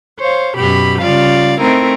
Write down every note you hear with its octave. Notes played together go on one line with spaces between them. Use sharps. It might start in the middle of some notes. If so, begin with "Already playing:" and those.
C5 C#5 F5
F#2 B2 G4 B5
C#3 G3 F4 D5 F5
A3 C4 D#4 E4 A#4